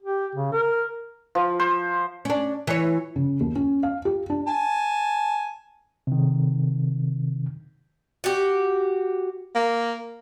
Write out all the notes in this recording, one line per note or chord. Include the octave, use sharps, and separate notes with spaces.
G4
C#3
A#4
F3
C5
C#4 D4
E3 C#5
C#3
D#2
C#4
F5
G4
D4
G#5 A5
C3 D#3
F#4 G4
A#3